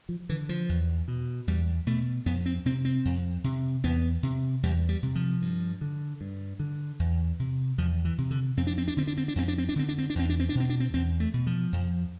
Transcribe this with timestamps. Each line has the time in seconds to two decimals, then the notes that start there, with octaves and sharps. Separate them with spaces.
0.09 F3
0.29 D3 E3
0.49 F3
0.69 E2
1.08 B2
1.47 E2 G3
1.87 B2 A3
2.26 F2 B3
2.46 C4
2.66 C3 C4
2.85 C4
3.05 F2
3.44 C3
3.84 E2 B3
4.23 C3
4.63 E2 G3
4.89 G3
5.03 C3
5.15 F3
5.42 G2
5.81 D3
6.21 G2
6.60 D3
6.99 E2
7.40 C3
7.78 E2 F3
8.05 E3
8.18 C3
8.31 D3
8.57 F2 C4
8.67 D4
8.78 C4
8.88 D4
8.97 D3 C4
9.07 D4
9.17 C4
9.28 D4
9.36 F2 C4
9.48 D4
9.58 C4
9.69 D4
9.76 D3 C4
9.89 D4
9.98 C4
10.10 D4
10.15 E2 C4
10.30 D4
10.40 C4
10.49 D4
10.55 B2 C4
10.70 D4
10.80 C4
10.94 E2 C4
11.20 A3
11.34 B2
11.47 F3
11.73 F2